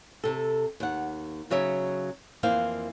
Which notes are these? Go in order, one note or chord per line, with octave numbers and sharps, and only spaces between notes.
C3 A4
D#2 F#5
C#3 F#3 C#5 E5
F2 E3 A#3 C5 F5